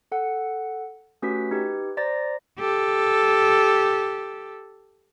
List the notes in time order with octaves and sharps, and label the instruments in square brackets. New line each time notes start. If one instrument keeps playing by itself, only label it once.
[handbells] A4 F#5
A3 C#4 F#4 G4 B4 B6
D#4 G4 B4
C5 D5 A#5 A6 A#6
[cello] G4 A4